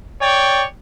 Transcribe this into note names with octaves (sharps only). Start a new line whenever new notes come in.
C#5 D5 G5